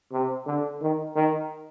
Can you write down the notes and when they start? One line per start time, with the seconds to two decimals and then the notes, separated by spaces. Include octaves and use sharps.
0.12 C3
0.46 D3
0.81 D#3
1.16 D#3